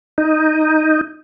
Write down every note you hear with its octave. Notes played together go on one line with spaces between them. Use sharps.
D#4